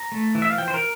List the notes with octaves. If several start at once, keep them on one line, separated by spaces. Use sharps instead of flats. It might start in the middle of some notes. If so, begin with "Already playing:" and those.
Already playing: A#5
A3
E3
E5
F5
F3 G5
C5
A#4